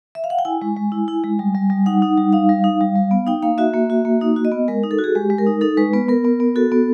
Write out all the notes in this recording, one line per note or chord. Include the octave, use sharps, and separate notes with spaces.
E5
F5
F#5
G5
E4 G#5
G#3
G#3
E4
E4
G#3
G3
G3
G3
D#4 F#5
D#4
G3
D#4 F5
G3
D#4
G3
G3
B3
D#4 G5
A#3 F5
F#4 E5
A#3
F#4
A#3
D#4
F#4
D#5
B3
G#3 A#4
D#4
A4
F#4
G#4
G#3 G4
G#3
A#4
D#4
D#4 A4
G#3 B4
B3 B4
B3 A#4
B3
B3
F#4 A4
B3